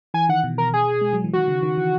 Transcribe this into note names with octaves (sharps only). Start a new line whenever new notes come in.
E3 G#5
D#3 F#5
B2
A#4
G#4
G#3
F#3
E3
D#3 F#4
C#3
D#3
E3